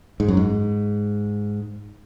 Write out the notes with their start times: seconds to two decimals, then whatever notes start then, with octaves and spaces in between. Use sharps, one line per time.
0.20 G#2
0.28 F#2
0.37 G#2